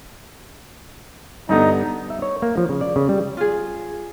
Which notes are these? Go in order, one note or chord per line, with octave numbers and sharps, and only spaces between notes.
G2 D3 B3 D#4
E5
C#5
A#3
F3
C#3
D5
C#3
G3
F4 G#4